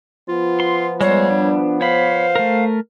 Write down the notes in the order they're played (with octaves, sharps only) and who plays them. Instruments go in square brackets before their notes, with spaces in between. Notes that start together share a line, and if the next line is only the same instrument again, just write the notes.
[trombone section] F3 B3 [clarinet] F4
[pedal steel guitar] C6
[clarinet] G3 [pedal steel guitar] G#3 C5 [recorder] C#5
[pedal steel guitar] D4
[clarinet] C5 [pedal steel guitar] C#5 B5 [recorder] F5
[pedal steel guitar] A3 A#4